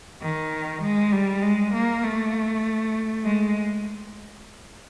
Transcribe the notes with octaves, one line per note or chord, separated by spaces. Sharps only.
D#3
G#3
G3
G#3
A#3
A3
G#3